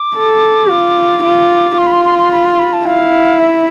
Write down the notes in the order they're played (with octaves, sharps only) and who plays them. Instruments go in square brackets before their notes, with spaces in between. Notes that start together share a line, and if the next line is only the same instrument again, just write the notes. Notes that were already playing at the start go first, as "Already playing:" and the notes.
Already playing: [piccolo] D6
[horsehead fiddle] A4
F4
F4
[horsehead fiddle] F4 [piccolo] C6
[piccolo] B5
C6
C6
C6
B5
C6
B5
A5
[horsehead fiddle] E4 [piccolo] F5
[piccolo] E5